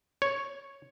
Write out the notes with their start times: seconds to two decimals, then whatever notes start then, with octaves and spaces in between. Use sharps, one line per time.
0.22 C#5